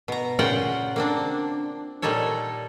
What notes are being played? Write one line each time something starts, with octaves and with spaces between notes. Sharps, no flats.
B2 A#5
A#2 C#3 F4 A#4 F#5 G5
A#3 C4 D4
A#2 G3 D#4 A4 C#5